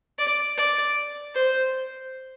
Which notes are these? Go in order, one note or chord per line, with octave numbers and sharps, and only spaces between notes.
D5
D5
C5